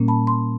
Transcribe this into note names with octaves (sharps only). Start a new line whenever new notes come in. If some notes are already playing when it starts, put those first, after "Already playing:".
Already playing: A#2 G3 A#3 C#4
A5 B5
C6